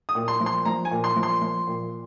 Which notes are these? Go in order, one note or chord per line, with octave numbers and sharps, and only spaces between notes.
D#6
A#2
C6
F3
C6
F3 A#5
G#5
A#2
C6
F3
C6
F3
A#2